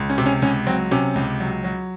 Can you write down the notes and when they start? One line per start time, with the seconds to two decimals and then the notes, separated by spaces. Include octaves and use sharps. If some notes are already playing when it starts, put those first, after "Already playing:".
Already playing: C#2
0.10 C#4
0.18 C3
0.26 C#4
0.42 C#2 C#4
0.67 F#3 C4
0.91 C3 C#4
1.15 C#2
1.40 F#3
1.64 F#3